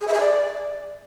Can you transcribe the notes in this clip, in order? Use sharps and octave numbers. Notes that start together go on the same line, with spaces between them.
G#4
E5
G#4
D5